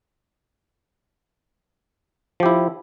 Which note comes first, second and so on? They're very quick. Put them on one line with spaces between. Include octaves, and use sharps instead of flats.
F3 G4 E4